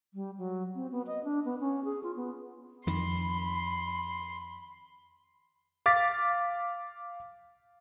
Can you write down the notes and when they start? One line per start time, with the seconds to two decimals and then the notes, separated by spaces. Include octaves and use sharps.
0.14 G3
0.38 F#3
0.75 C4
0.92 B3
1.07 D#5
1.24 D4
1.45 B3
1.60 C#4
1.84 G#4
2.03 F4
2.16 B3
2.87 F2 D#3 B5 C6
5.86 F5 D6 A6 B6